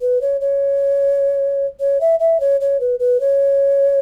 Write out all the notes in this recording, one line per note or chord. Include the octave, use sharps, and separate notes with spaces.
B4
C#5
C#5
C#5
E5
E5
C#5
C#5
B4
B4
C#5